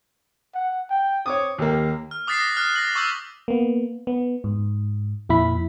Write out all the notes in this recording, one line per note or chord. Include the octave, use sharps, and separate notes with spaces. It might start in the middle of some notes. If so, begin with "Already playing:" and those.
F#5
G5
C4 C#5 D6 D#6
D#2 A#3 G4
F6
D6 D#6 F#6 A6 B6 C7
A#6
D#6 F6 F#6
F#6 A#6 F#7
C#6 D6 E6 G6
A#3 B3
B3
G#2
F2 A#2 E4 E5 B5